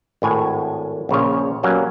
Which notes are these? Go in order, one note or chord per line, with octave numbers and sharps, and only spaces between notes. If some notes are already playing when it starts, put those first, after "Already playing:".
G#1 A2 G#5
A#1 C#3 F4 C#5
B2 F#3 G3 A#3 C#4